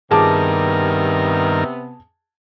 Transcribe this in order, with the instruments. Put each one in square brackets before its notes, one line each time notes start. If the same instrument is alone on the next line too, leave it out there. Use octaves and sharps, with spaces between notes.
[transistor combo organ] G2 D#3 A#4 [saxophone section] C3 B3 [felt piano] G#4 A5 D6